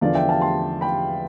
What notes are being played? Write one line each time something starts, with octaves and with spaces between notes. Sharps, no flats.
E2 D3 F3 D5 F5
E5 G5
F5 A5
A5 C6
G5 B5